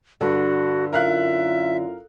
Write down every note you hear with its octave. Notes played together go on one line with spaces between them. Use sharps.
G2 D3 F#4
F#2 E4 F4 A#4 E5 F5 F#6